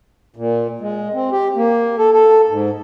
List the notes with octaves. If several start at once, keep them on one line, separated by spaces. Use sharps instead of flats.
A#2
G#3
C4
G4
A#3
A4
A4
G#2